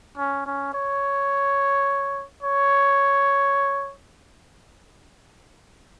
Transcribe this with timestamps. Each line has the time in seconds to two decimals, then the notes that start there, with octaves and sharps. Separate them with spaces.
0.18 C#4
0.46 C#4
0.74 C#5
2.42 C#5